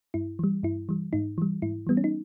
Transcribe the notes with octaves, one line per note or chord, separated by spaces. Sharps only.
G2 E4
E3 G3
G2 E4
E3 G3
G#2 D#4
E3 G3
G#2 E4
E3 G3 B3
C#4
D#4